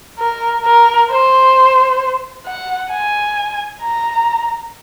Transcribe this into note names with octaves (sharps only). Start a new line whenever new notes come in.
A#4
A#4
C5
F#5
G#5
A#5